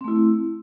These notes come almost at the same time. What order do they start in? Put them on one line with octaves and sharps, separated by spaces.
C4 A3 E4